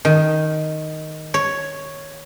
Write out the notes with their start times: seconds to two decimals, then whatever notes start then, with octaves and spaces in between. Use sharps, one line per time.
0.05 D#3
1.34 C#5